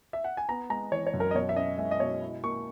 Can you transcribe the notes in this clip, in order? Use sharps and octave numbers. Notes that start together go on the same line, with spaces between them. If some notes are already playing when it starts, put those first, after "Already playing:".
E5
F#5
G#5
B3 A#5
G#3 A#5
E3 C#5
C#5
F#2
A#4
D#5
B2 C#5
E5
C#4 D#5
G#3 E5
D#5
B2 C#5
E4
A#3 C#6